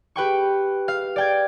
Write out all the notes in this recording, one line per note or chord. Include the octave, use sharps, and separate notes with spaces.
G4 B4 G5 C#6
F5
D5 G5 G#6